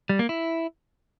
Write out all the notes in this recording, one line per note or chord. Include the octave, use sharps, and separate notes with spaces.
G3
A#3
E4